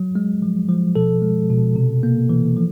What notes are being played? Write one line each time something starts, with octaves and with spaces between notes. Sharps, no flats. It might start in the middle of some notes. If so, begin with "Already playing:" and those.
Already playing: F#3
G#3
F3
F3
B2 A4
G#3
B2
C3
A#3
E3
F3